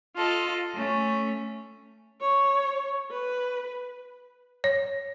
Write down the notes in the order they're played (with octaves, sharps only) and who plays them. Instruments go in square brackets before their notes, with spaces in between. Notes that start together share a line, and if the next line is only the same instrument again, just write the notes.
[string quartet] F4 A4 D#5
A3 C#4
[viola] C#5
B4
[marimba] C#5